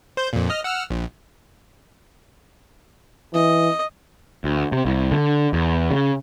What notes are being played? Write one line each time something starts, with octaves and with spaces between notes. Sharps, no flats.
C5 G6
F2 A#2
D#5 F6
F#5 E6 F6
A#1
E3 D#5
D2
C3
C2
D3
E2
C#3